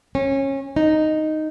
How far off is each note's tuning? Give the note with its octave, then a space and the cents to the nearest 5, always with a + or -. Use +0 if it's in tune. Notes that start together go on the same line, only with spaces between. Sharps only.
C#4 -25
D#4 -5